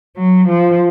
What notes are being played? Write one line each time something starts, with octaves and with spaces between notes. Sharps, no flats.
F#3
F3